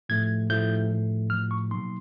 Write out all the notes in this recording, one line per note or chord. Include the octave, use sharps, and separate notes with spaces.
A2 F3 A3 G#6
A2 F3 A3 G6
A2 F3 A3
A2 F3 A3 F6
C#6
B2 F#3 A#3 D#4 C6